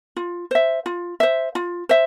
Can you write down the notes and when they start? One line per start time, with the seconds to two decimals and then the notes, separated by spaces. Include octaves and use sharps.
0.16 F4
0.51 C5 E5
0.86 F4
1.20 C5 E5
1.55 F4
1.89 C5 E5